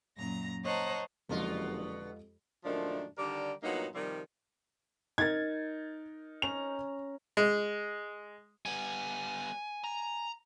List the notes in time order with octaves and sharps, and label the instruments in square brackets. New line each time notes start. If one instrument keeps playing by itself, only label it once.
[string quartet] F#2 A#2 A#5 A#6
C5 C#5 D#5 F#5 A5 A#5
[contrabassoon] F#1 [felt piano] F2 G#3 G4 [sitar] B2 D3 F4
[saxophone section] F#2 A#2 D#3 F3 A3 D4
D3 D#3 G3 A#4 D5
G2 A#2 F#3 A#3 B3 D#4
C3 D#3 F3 G3
[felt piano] D#4 A#4 [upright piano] G#6 A6
[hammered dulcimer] C#4 A#5 [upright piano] F7
[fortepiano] G#3
[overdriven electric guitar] G3 B3 [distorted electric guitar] G#5
[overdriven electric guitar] A#5